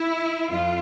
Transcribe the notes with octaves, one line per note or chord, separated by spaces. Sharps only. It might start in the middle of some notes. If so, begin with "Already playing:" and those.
Already playing: E4
F2 F4